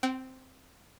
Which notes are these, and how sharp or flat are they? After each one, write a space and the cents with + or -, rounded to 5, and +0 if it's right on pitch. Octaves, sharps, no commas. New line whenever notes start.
C4 -5 G5 -40